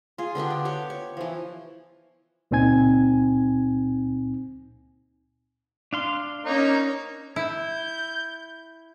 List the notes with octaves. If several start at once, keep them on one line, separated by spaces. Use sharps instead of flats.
F4 G#4
D3 B3 D4 G4
D5
G4 C#5 D6
C#5
E3 F3
C#2 A#2 C4 D#4 G#5 G#6
D4 F5 C6
A#3 C#4 D#4 C#5
E4 G6